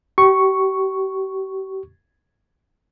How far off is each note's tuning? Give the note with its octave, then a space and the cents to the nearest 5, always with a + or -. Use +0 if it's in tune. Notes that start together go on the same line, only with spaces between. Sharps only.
G4 -35 C#6 +0